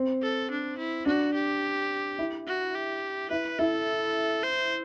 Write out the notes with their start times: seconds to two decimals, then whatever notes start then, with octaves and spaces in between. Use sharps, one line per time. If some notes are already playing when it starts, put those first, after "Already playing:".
Already playing: C4
0.22 A4
0.50 D4
0.78 E4
1.06 D4 F#4
1.34 G4
2.19 E4
2.46 F#4
2.75 G4
3.31 E4 B4
3.59 E4 A4
4.43 C5